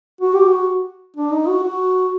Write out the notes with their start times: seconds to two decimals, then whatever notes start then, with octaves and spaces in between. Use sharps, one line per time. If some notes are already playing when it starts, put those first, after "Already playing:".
0.21 F#4
0.34 G4
0.47 F#4
1.16 D4
1.32 D#4
1.48 F#4
1.64 F#4